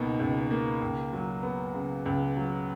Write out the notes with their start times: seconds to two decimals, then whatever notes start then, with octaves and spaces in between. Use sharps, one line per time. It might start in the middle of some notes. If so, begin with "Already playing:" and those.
Already playing: C#2 B2 A#3 D#4
0.20 C#2
0.51 A#3
0.82 C#2
1.13 F#3
1.43 B3
1.74 C#3
2.06 C#2
2.37 F#3